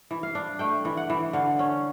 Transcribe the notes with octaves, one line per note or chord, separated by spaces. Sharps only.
E3
F5
D4
A3 G5
E3
F#5
E3
D3 F5
C#4